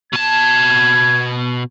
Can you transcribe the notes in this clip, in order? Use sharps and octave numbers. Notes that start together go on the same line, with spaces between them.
B2 A5 G#6